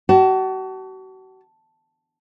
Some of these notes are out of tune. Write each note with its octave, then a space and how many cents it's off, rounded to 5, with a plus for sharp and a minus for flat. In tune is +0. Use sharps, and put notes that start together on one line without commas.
F#4 +40 A5 +0